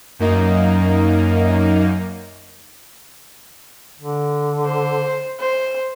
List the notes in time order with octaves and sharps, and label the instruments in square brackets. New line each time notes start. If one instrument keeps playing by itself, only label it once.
[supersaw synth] F#2 A#3 D#4
[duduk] D3
[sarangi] C5
C5